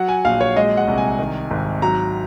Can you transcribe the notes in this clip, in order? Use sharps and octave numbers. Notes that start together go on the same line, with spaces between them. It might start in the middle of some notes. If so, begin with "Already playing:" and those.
Already playing: F#3 F#5
G#5
A#1 F5
C#5
G#3 D#5
F#5
C2
G#5
D#3
G#1
F#3 A#5